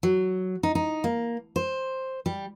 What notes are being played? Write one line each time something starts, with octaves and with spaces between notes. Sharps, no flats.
F#3
D#4
D#4
A#3
C5
G3